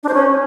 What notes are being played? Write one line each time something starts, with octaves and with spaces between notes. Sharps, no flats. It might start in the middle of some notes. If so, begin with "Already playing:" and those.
D4
C5
C#4